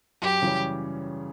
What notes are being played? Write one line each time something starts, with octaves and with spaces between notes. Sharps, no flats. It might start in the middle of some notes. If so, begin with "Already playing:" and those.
F#2 G4
C#3 E3 G3 C#4